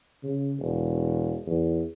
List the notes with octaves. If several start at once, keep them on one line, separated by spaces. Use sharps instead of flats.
C#3
E1
E2